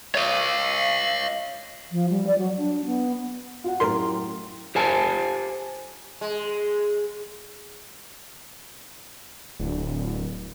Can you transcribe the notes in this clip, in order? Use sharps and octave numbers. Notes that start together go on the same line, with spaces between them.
C#5 D#5
F3
G3
D5
F#3
D4
B3
F4 F#4 F#5
F#2 A2 G4 A#4 C6
G4 C5 G#5 A5
G#3
D1